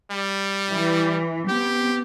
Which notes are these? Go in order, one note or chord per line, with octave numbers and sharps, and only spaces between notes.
G3
E3
B3 C4 G4